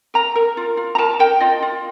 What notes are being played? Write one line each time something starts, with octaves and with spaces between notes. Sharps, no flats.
A#4 A#5
A#4
F4
F4
A#5
A#4 A5
A#4 G5
F4 D#5
F4